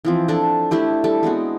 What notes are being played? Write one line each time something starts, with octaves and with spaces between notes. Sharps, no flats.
E3 F3 C4
D4 A4
A3 D4 E4 G4
G3 A4
G#3 B3 C4 F#4